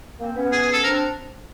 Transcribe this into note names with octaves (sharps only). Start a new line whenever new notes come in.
A#3 C4
B3 C#4
G#4
G#4
A4
C4 D4 A#4